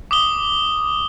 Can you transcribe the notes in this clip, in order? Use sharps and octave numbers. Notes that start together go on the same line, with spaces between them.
D6 D#6 G7